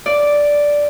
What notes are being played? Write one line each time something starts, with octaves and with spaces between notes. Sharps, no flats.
D5